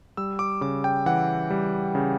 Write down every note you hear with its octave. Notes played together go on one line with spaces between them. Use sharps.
G3 E6
D6
C#3 D6
G5
E3 F#5
G3
C#3